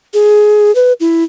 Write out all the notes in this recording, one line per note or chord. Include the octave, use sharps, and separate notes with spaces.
G#4
B4
E4